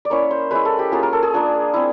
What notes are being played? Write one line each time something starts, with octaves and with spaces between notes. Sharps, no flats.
D5
A#3 C#4 E4 C#5
C5
G#3 C#4 E4 B4
A4
G4
A#3 C#4 F4 G#4
A#4
A4
G#4
A#3 D4 F4
C4 E4